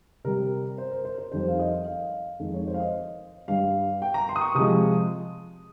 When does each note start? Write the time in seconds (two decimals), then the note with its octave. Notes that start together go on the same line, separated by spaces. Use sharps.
0.24 C3 G3 A#4
0.78 C5
0.91 A#4
1.05 C5
1.18 C5
1.32 F2 D#3 G3 C5
1.48 F5
1.59 D#5
1.86 F5
2.39 F2 D#3 G#3
2.54 C#5
2.67 C5
2.74 F5
2.80 D#5
3.48 G2 G3 F5
4.02 G5
4.14 A#5
4.29 C6
4.36 D#6
4.41 C#6
4.55 C3 F3 G#3 D#6